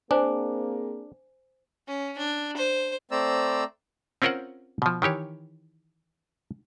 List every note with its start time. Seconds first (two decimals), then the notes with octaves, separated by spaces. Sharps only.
0.11 A#3 C4 D4 G#4 C5 G#5
1.87 C#4
2.18 D4
2.57 C5
3.11 A3 C4 C5 D5 A#5 E6
4.22 C4 C#4 F4 A#4 C5 F#5
4.82 B2 F3
5.02 D#3 E3 G4 C#5